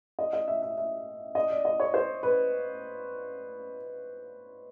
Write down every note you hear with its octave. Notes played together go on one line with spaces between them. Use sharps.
D#5
D#5
E5
E5
E5
D#5
D5
D#5
C#5
C5
B4